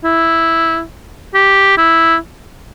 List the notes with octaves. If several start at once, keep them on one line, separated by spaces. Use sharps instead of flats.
E4
G4
E4